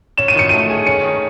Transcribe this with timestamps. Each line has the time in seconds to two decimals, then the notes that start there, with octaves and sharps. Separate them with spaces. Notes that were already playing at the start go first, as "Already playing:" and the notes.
0.17 C#4 E7
0.28 D#7
0.35 D#3 C#7
0.49 A3 D#7
0.70 G#4
0.86 C#4 C#7
1.04 D#3